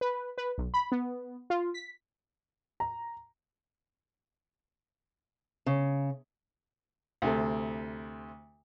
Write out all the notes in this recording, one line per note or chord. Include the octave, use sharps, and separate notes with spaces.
B4
B4
B1
B5
B3
F4
B6
A#5
C#3
D2 C3 A4